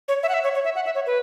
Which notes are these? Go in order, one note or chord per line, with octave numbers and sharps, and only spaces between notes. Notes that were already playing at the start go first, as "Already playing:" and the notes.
C#5
E5
F#5
E5
C#5
C#5
E5
F#5
E5
C#5
B4